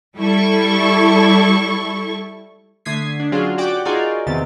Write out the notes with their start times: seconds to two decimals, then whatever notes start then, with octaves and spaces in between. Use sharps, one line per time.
0.17 G3 E4 A4 C#6
2.85 D3 A3 D#6 G#6 B6 C7
3.20 D4
3.32 F#3 C#4 D4 F4 F#4 G#4
3.58 F#4 G4 D5 F#5 G5 D6
3.85 D#4 F4 F#4 G#4 A#4 D5
4.27 E2 C3 D#3 B3 A6